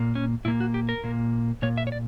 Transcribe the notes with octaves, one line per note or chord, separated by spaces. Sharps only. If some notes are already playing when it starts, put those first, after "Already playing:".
Already playing: A#2 A#3
C#4
A#2 A#3 E4
F#4
G4
A#4
A#2 A#3
A#2 A#3 C#5
E5
C#5
D5